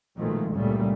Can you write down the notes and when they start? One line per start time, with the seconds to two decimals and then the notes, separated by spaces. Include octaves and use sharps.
0.17 A#1 B2 D#3 F3 G#3 A3
0.54 C#2 G2 A#2 C#3 G3 A3